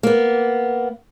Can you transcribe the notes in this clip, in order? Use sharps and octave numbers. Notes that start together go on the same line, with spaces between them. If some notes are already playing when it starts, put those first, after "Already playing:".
A#3 B3